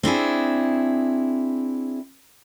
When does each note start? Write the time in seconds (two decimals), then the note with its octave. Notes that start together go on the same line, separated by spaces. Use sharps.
0.03 C4 D4 E4 G#4